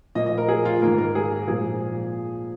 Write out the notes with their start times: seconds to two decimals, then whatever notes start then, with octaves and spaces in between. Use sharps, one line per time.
0.15 A#2 F3 A#3 D#5
0.26 D#5
0.38 A#4
0.48 G#4
0.65 F4
0.82 G#2 D#3 A#3 A#4
0.98 A#4
1.15 G#4
1.48 A#2 F3 G#3 G#4